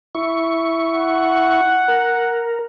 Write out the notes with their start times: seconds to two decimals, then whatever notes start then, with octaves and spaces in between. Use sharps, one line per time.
0.15 E4 C#6
0.93 F#5
1.88 A#4